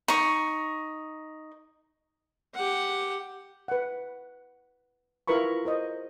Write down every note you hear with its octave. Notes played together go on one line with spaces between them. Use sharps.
D#4 C#6
G4 F#5
B4 F#5
E4 F4 A#4 B4 B5 C#6
A#4 C5 D#5